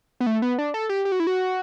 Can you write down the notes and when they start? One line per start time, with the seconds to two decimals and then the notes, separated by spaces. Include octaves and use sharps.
0.20 B3
0.27 A3
0.42 B3
0.58 D4
0.74 A4
0.89 G4
1.05 G4
1.12 F#4
1.20 E4
1.27 F#4